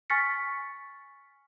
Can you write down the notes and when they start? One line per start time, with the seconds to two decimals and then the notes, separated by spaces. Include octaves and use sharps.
0.10 G#5 C#6 F6 A6 B6 C#7